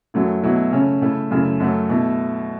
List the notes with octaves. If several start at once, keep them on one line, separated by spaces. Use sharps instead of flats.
F#2 F#3 A3 E4
B2 F#3 A3 E4
C#3 A3 C#4
C#3 A3 E4
F#2 C#3 A3 E4
F#2 F#3 A3
B2 A3 E4